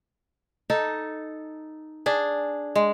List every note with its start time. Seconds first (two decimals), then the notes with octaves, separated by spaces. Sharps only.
0.70 D#4 A4
2.06 D4 G#4
2.75 G#3